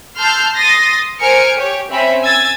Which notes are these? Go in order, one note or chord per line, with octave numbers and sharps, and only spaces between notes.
A5 C6 E6 F6 G6
C6 D#6 A6 A#6
A#4 C5 G#5 F6 C#7 D7
G4 C#5
C4 C#4 E5 B5
G#5 E6 G#6 A6